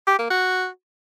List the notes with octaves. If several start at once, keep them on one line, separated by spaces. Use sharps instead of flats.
G4
A#3
F#4